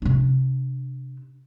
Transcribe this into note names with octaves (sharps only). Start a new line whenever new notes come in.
C3 D4